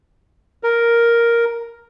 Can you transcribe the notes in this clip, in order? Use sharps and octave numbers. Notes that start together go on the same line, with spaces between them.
A#4